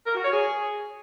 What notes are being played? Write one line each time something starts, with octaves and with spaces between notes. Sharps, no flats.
A#4
F#4
C#5
G#4